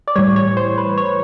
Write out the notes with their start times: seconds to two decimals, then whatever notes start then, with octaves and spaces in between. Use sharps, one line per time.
0.07 D5
0.16 A2 E3 G3 C#5
0.36 C#5
0.57 C5
0.78 B4
0.98 C#5